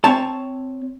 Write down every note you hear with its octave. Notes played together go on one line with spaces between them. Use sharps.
C4 C#5 A5